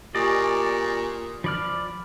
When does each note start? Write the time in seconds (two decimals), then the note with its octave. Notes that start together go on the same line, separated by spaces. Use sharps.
0.15 A#2 G4 D5 D#5 G#5 C#6
1.44 F3 D5 B5 F6